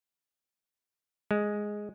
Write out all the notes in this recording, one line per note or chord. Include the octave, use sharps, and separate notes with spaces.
G#3